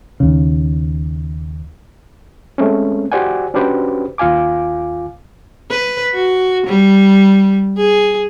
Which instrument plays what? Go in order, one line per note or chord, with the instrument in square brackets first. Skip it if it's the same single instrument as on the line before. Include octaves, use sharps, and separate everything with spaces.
[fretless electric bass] D#2 C#3
[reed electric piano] G#3 A3 C4 C#4
F#4 G4 C5 D5 F#5 G#5
C#4 D4 F#4 G4 B4 C5
D#2 F4 F5 G#5 D6
[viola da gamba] B4
F#4
G3
G#4